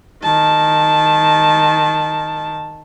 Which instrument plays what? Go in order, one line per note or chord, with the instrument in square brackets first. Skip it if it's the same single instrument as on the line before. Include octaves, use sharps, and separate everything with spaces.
[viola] D#3 A5